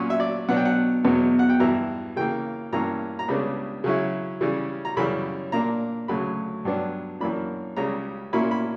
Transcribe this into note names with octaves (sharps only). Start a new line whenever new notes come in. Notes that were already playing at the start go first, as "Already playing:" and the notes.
Already playing: A#2 F#3 C#4
E5
D5
B2 F#3 B3 D4 F#5
G5
F#5
E2 B2 F#3 B3
F#5
G5
G2 E3 B3 E4 A#5
C#3 E3 A#3 G5
G2 E3 A#3 C#4 A#5
A#5
C#2 C#3 G3 B3 D4 B5
C#3 F#3 C#4 E4
C#3 E3 G3 C#4
A#5
F#2 C#3 E3 G3 B5
A#2 A#3 D4 A#5
D2 C#3 F#3 B5
G2 F#3 B3 D4
F#2 E3 A#3 D4 B5
C#2 C#3 G3 A#5
A#2 A#3 C#4 E4 B5
B5